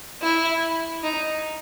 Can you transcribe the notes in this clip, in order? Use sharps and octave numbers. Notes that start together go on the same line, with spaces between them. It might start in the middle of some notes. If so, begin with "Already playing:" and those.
E4
D#4